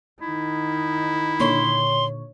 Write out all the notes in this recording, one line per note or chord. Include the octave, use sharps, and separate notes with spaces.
D#3 D#4 E4
A#2 D3 C#5 C6